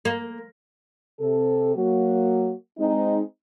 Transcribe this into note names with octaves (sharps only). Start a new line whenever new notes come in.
A#3
C3 A4
F#3 A#3 F#4
G#3 C4 D#4